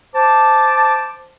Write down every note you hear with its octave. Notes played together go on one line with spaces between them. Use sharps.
C5 A5 D6